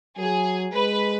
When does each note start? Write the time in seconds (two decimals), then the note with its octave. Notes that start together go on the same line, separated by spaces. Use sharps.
0.18 F#3 G#4
0.73 G#3 B4